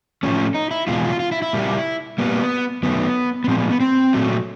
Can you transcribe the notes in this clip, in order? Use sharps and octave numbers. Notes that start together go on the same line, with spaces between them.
A2 F3 A3 C#4
D#4
E4
E2 B2 G#3 F4
F4
F4
E4
E4
A#2 G3 A#3
A#2 G3 A#3 B3
F#2 D#3 F#3 A3 B3
B3
A#2 F3 G#3 C4
B3
B3
C4
A#2 F#3 A3